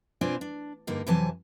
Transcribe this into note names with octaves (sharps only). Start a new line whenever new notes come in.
B2 C4 D4 F4 G#5
D4
G2 D3 A#3 D#4
F2 C3 E3 F#3 G#5 A5